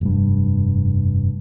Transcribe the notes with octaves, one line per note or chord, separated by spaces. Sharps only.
F1 G2